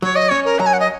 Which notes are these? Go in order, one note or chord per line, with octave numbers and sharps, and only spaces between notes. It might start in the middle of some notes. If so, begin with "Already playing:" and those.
F#3 C#5
D#5
C#4 C#5
A#4
F#3 A#5
G#5
F#5
D#5